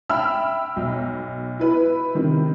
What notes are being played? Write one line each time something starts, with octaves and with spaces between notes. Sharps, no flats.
E5 G5 B5 E6 F6
B1
E4 B4
C3 D#3